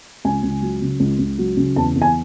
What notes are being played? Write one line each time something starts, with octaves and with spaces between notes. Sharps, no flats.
C#2 G#5
C#2
F#3
C#3
C#2
C#2
F#3
C#3
E2 A5
E2
G#5